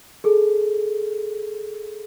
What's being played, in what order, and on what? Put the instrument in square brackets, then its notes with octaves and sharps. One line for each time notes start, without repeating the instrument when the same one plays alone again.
[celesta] G#4 A4